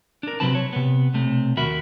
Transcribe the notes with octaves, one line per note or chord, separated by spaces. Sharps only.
D4 A#4
C3 D#3 F#3 C4 B4 A5
C#5
C3 B3
B1 C3 A3
D#2 F#4 A#4 E5 B5